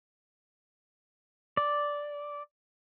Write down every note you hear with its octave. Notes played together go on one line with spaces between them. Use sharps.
D5